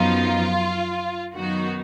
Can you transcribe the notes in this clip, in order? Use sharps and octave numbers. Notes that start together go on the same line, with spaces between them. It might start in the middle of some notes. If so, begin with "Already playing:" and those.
Already playing: F#2 F3 B3 D#4 F4
F#2 D#3 F#3 B3 D#4 F#4